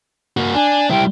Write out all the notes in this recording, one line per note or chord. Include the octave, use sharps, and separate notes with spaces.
A#3 F#4
D4 G#5
G3 E4 G5